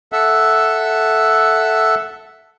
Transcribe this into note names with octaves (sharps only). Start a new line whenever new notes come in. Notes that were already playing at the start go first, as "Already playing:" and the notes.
A4 E5 F#5